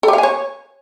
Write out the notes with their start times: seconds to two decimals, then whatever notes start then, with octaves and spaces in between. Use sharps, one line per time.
0.03 A4
0.08 G4
0.13 F5
0.18 G#5
0.23 C#5